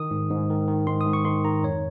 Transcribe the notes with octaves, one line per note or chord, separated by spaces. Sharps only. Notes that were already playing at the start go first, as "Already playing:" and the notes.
Already playing: D#3 D#6
G#2
G#2
D#3
D#3
G#2 C6
D#6
G#2
C#6
D#3 C6
D#3 A#5
F2 C#5